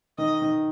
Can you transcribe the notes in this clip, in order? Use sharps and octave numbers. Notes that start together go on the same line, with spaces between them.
D#3 D#5
D#3